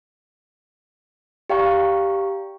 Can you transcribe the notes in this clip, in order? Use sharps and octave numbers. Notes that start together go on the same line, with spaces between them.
G4 D5 F5 G5 A#5 C#6